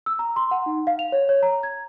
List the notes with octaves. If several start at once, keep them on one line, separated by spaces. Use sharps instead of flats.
E6
A#5
C6
F#5
D#4
F5
F7
C#5
C#5
A#5
G#6